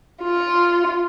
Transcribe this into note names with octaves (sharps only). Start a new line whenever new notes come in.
F4